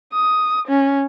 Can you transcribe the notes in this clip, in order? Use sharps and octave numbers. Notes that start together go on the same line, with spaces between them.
D#6
C#4